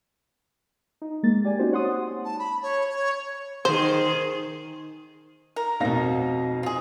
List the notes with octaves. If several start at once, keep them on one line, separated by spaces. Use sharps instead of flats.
D#4
G#3 A#3 A6
G4 D5 G#5
C4 C#4 D#4 F#4 G4 C5
C#5 F#5 C6 D#6
A5
B5
C#5
C#5
D#3 G#4 C5
A#4
F2 B2 D#4 F5 A#6
F4 G#4